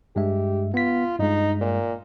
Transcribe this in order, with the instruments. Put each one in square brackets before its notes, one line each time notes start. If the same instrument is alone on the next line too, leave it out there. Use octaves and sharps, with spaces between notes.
[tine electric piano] G2 G#3 E5 [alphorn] G4
[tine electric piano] B3 B6 [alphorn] F4
[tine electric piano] G2 G#3 [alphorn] D#4
[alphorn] A#2